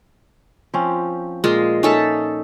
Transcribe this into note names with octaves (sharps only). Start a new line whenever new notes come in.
F3 C4 C#4
A#2 G#3 F4
C#4 D#4 A4 E5